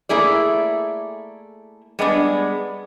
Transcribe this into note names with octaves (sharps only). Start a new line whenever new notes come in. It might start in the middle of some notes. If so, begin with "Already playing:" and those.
A3 A#3 E4 G#4 D5
G3 G#3 B3 D4